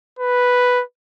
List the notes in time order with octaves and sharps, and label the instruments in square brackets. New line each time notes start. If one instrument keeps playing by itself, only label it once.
[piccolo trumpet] B4